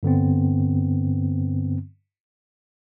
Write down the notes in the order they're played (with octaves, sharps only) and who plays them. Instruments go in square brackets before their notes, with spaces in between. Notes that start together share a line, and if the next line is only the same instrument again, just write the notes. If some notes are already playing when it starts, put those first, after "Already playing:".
[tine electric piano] G2 D3 B3 C4